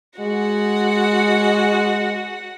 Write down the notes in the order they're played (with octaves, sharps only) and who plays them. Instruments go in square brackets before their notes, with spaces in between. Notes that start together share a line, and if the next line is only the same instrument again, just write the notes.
[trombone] G#3 [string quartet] F#4 F#5